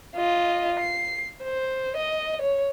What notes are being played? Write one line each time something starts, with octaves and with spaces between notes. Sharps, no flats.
F4 D#5
C7
C5
D#5
C#5